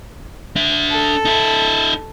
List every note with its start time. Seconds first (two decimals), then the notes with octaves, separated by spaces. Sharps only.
0.56 D4 E5
0.91 A4
1.25 D#4 E5